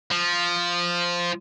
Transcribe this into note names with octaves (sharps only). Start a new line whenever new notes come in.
F3